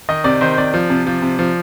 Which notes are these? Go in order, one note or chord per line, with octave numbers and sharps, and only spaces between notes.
D#3 D#5
C3 D5
D#3 C5
C3 D5
F3
C3
F3
C3
F3